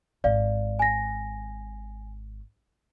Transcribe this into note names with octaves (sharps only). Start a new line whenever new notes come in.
G#1 D5 F5
G#5 A#6